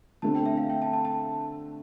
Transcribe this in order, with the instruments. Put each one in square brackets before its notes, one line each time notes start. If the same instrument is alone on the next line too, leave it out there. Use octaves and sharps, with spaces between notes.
[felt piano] D3 A3 C4 [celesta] A5
[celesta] G5
E5
F5
G5
A5
A5
A5